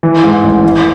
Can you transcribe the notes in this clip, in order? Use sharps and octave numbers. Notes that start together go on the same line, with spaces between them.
E3
G#2
A1
E3